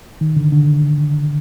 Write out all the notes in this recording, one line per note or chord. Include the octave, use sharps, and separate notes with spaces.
D#3
D3
D3